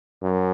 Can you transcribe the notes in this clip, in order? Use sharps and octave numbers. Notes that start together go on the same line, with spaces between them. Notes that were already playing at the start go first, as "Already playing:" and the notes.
F#2